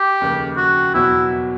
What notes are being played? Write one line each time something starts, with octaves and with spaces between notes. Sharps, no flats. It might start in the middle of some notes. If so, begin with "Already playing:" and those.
Already playing: G4
F1 D#2 C#3
F#4
E2 B2 F#3 B3 E4